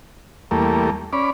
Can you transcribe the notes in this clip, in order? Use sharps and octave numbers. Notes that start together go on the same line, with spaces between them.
E2 G3 A3 A#3
C#4 D5 B5